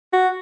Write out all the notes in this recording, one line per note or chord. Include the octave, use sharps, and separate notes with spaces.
F#4